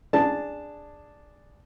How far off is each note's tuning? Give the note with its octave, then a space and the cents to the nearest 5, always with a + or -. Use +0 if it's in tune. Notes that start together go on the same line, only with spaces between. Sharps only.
D4 +0 G#4 -10 A5 +0